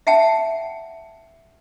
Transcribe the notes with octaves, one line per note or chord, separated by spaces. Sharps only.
E5 F#5 G5 A5